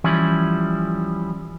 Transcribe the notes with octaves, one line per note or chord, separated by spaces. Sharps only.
E3 F3 G3 C#4 E4